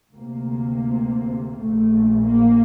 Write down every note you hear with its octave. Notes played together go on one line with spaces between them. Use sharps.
D2 C3 A#3
A#1 A#2 A3
A#3